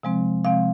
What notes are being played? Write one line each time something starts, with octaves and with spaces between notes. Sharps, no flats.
C3 F3 G#3 C4
C3 F3 G#3 C4 F5